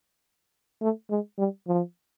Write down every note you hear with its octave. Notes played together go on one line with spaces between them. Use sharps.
A3
G#3
G3
F3